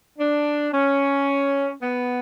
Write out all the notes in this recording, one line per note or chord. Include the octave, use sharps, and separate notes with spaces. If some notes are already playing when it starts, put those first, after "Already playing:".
D4
C#4
B3